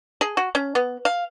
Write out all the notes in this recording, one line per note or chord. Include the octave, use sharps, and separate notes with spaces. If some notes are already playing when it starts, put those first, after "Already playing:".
G#4
F#4
C#4
B3
F5